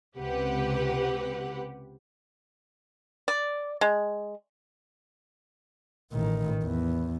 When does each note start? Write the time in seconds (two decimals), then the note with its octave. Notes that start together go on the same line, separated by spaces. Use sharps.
0.15 C#2 C3 G4 B4 F#5
3.28 D5
3.81 G#3
6.13 A1 D#3
6.64 E2